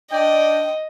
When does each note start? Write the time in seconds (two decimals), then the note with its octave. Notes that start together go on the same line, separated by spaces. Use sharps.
0.12 D4 D5 D#5 G5